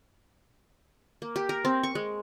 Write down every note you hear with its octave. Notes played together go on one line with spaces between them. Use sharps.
A#3
G4
A#4
C4
C#6
G#3